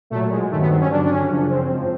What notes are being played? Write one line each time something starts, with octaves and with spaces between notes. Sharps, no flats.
A#2 F#3 A3
G#3
G2 D#3 F#3 A3
B3
C4
C#4
G2 D3 F#3 D4
D4
C#4
F#2 C#3 F3
C4
G#2 F3